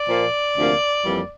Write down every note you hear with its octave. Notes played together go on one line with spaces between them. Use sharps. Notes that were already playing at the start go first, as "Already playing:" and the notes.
Already playing: D5
A#2 F3 A#3
D2 C3 F3 A#3
F2 E3 G3 A#3